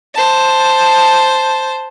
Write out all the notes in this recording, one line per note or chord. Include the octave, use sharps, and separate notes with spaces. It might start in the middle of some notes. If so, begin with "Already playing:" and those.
C5 A5